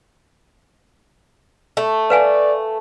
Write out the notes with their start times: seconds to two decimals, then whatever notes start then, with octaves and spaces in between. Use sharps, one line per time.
1.77 A3
2.10 B4 D5 F5 G#5